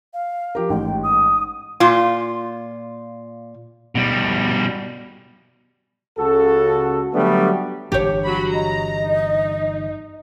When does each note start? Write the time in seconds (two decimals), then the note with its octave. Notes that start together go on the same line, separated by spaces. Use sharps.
0.13 F5
0.55 F3 G4 A#4
0.70 A1 G#2 G5
1.03 D#6
1.80 A#2 F4
3.95 B2 G3
6.19 C#2 C#3 F#4 A4
7.14 D3 F#3 G3 A3 B3 D4
7.92 G1 E3 D4 G4 C#5
8.24 F#3 F#4 B5
8.54 D#5 A#5
9.05 D#4